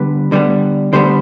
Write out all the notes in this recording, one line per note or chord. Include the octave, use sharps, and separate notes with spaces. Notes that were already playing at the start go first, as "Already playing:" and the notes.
Already playing: D3 G3 B3 B4
D3 G3 B3
D3 G3 B3 C5